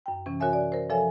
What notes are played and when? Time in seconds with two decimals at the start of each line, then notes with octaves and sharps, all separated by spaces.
0.06 F#2 G5
0.26 C3 E3 C#4
0.40 F#4 A#4 C#5 E5 G#5
0.53 D5
0.72 A#4 C5
0.90 F3 A4 C#5 E5 G#5